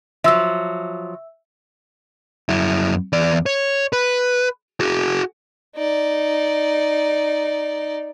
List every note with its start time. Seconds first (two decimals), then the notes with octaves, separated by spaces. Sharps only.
0.24 F3 F#3 E5 E6
2.49 F#2 E4
3.13 E2 D5
3.46 C#5
3.93 B4
4.80 F#4 G#4
5.76 D#4 D5